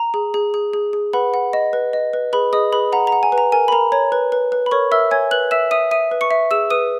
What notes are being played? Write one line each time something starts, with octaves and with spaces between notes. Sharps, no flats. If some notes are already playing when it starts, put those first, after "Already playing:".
Already playing: A#5
G#4
G#4
G#4
G#4
G#4
B4 F#5 B5
F#5
D#5
B4
D#5
B4
G#4 B4 B5
G#4 D#5 D#6
G#4 B4 B5
F#5 A#5
A#5
F#5
G#5
B4
A#5
A#4 G#5
B5
A#4 A#5
C#5 A#5
B4
B4
B4
B5
A#4 C#5 C#6
A#4 E5 E6
C#5 G#5 G#6
B4 F#6 F#7
E5 E6 E7
E5 D#6 D#7
E5 D#6 D#7
B4
C#6 C#7
E5
G#4 E6 E7
B4 D#6 D#7